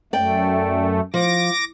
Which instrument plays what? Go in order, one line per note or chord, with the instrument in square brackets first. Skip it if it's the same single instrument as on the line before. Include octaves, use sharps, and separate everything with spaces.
[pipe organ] F#2 A3 [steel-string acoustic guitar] D5 G5
[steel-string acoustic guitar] F3 [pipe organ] D6 A#6